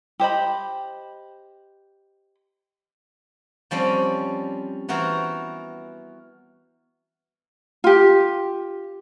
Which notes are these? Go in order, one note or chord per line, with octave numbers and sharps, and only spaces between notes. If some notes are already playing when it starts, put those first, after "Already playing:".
G4 C5 D#5 B5
F3 G3 C4 C#4
E3 B3 F#4 A#4 C5
F4 G4